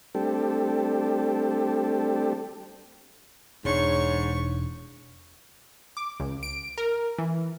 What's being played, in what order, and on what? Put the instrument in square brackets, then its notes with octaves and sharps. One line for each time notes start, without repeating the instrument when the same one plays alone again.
[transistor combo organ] G3 A3 C4 D4 G4 A4
[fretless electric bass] E1 D4 [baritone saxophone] G#2 [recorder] C#5 [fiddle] C#6
[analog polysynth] D6
C#2
D7
A#4
E3